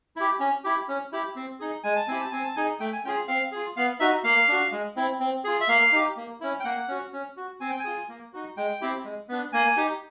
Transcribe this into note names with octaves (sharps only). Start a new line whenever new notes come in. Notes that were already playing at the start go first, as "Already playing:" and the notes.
E4 G4
C#4
E4 G4
C#4
E4 G4
C4
D#4 G#4
G#3 G#5
A5
C4 E4 G4 G#5
A5
C4 G#5
A5
D#4 G#4 G#5
A3 G5
G#5
C#4 F4 G#4 G5
C4 F5
F4 G#4
B3 F5
D#4 F#4 E5
A#3 F5
D4 F#4
G#3
C4 E4
C4
F4 G#4
E5
A#3 F5
D#4 G4
A#3
C#4 E4
G5
A#3 F#5
C#4 F#4
C#4
F#4
C4 G#5
G5
G#5
F4 G#4
A#3
D#4 F#4
G#3 G5
C4 E4 G4
G#3
B3 D4
A#3 G#5
D#4 G4